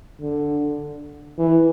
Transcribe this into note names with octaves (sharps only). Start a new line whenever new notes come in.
D3
E3